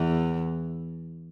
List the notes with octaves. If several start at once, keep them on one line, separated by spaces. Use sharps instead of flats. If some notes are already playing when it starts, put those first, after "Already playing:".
Already playing: E2 E3